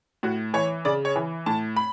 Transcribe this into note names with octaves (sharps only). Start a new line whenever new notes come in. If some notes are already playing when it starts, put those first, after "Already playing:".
A2 F#4
E3 C#5
C#3 D5
C#5
E3
A2 A5
B5